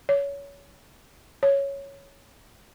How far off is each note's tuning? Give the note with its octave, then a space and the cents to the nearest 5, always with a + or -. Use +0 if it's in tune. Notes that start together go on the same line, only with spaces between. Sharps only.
C#5 +20
C#5 +0